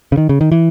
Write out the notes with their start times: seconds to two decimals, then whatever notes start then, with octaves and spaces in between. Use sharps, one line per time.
0.12 C#3
0.17 D#3
0.29 C#3
0.41 D#3
0.52 E3